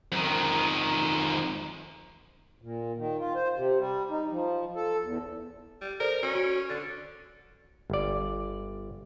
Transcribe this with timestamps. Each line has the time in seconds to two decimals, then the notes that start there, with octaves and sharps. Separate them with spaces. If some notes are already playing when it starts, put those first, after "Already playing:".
0.12 F2 D#3
2.61 A#2
2.97 D#3
3.20 F4
3.35 C5
3.56 C3
3.78 G3
4.10 D#4
4.31 F3
4.76 A4
5.03 E2
5.81 G3
6.00 A4 A#4 C5 D5
6.23 C#4 F#4
6.35 F#4 D7
6.70 D3 A6
7.90 G1 D5